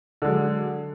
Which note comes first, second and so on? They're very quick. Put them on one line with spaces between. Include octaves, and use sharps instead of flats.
D3 G#3 F#3